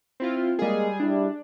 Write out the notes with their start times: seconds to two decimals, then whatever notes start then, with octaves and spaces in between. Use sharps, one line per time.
0.20 C4 E4 F4
0.59 G3 G#3 A#3 G#4
1.00 G3 D4 E4